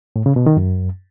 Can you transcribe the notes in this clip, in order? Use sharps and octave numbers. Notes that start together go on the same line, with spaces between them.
A2
C#3
B2
D#3
F#2